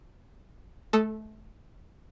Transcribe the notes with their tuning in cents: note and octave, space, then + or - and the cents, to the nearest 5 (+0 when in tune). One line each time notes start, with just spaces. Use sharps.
A3 -25 A4 +0 D#6 +0